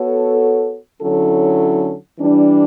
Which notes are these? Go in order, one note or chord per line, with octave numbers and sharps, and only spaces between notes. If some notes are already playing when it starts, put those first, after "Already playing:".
Already playing: B3 F#4 A4 C#5
D3 F#3 C#4 E4 A4
E3 G3 D4